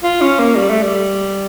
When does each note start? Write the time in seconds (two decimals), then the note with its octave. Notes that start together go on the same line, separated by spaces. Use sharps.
0.03 F4
0.21 C#4
0.39 A#3
0.56 G3
0.70 A3
0.83 G3